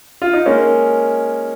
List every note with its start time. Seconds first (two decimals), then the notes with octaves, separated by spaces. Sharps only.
0.22 F4
0.33 D#4
0.46 G#3 A#3 C#4